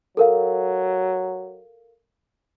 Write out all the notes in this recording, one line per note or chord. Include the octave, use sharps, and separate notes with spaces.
F#3 A4 A#4 F5